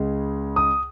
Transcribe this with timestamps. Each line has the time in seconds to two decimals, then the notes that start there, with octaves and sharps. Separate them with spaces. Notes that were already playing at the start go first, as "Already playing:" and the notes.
Already playing: C#2 C#3 G#3
0.56 D#6